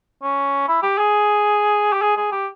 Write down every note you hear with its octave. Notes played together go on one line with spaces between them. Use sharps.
C#4
E4
G4
G#4
G4
G#4
G#4
G4